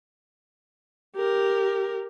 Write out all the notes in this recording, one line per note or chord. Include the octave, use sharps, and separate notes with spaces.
G4 A#4